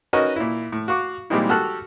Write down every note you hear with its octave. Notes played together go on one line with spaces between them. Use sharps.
C#4 D#4 F#4 A#4 B4 D#5
A#2 E4
A2
F#4 F5 C#6 D6
A#2 G3 G#3 C4 D#4 E4
F#4 G4 A4 A5 F6 F#6